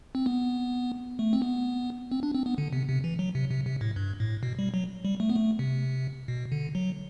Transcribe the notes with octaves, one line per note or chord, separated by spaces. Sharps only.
C4
B3
A3
C4
B3
C4
D4
C4
B3
D3
C3
C3
E3
F#3
C3
C3
C3
A2
G2
A2
B2
G3
F#3
G3
A3
B3
A3
C3
B2
D3
F#3